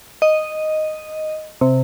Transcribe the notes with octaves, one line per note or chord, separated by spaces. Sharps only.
D#5
C3